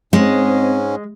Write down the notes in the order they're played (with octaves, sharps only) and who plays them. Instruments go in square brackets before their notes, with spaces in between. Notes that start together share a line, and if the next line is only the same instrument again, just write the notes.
[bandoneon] G#2 C#4 [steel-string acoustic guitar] G#3 [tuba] C4